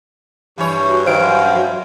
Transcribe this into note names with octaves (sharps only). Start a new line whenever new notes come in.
G2 E3 C#5
F#4
D#3 C5 F5 D7
F#2
F#3